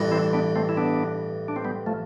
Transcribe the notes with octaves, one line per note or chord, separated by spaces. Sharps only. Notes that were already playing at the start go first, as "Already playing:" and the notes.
Already playing: A1 G2 E3
C4 E4
B3 D4
A3 C4
E4
B3 D4
D4
C4
G3 B3
F3 A3